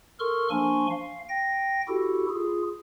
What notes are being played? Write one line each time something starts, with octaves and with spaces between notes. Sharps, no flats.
A4 A#4 C6 C#6 F6
F3 A#3 D4 G#5 C6 C#6
F5
G5 A#6
E4 F#4 G4 A4
F4 G#4